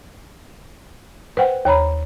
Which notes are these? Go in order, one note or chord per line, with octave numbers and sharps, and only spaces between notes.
B4 C5 F#5 G5
D#2 C#5 A#5 B5